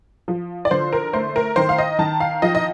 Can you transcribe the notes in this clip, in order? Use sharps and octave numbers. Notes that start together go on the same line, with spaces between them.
F3
D5
D3 C5
A#4
A3 C5
A#4
D#3 C5
F5
D#5
D#3 A5
F5
F3 D#5
D#5